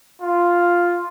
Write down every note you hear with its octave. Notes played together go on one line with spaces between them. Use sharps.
F4